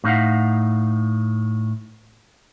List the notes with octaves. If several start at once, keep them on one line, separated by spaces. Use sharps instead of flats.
A2 D#4 F5 F#5